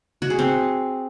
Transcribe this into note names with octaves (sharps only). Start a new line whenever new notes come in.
F#4
G#4
C4